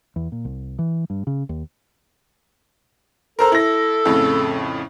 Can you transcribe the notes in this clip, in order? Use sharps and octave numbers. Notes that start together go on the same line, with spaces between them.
E2
A#2
C2
E3
G2
C#3
D#2
A4 A#4 C5 A#5
E4 A#6
F2 A2 C#3